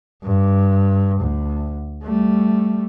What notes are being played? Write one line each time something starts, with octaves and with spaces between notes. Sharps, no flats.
G2
D2
G3 A3